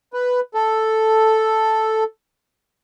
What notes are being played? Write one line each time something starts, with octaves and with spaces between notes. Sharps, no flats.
B4
A4